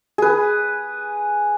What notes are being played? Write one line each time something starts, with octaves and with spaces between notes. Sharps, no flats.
G#4 B4